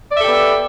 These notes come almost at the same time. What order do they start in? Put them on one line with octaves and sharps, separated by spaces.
D5 E5 A4 G4 B3